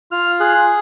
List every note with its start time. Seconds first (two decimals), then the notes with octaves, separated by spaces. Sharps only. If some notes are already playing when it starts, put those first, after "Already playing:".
0.12 F4 F6
0.40 G#4 F#6